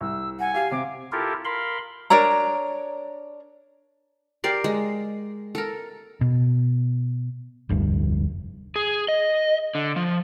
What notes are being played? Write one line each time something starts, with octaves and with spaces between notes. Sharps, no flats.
C2 E6
F#5 G#5
G4 F5
C3 D6
E4 F4 G4 A4 A#4
A#4 F5 B5 C6
D4 A#4 C#5 A#5
G4 A#4 D5 C6
G#3
A4 A#4
B2
F1 D2 G2
G#4
D#5
D3
F3